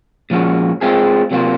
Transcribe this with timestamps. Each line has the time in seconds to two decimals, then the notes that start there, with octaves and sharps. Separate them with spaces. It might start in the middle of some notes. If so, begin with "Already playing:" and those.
0.30 A#2 F3 G#3 C#4 F#4
0.81 G#3 C4 F4 G#4
1.31 C3 F#3 A#3 F4